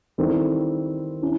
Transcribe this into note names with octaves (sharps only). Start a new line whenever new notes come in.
D#3 G3 C4 E4 A4
C#4 E4